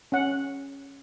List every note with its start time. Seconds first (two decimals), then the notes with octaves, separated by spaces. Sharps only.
0.12 C#4 F#5